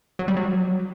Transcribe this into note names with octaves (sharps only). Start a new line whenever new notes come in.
F#3
G3
F#3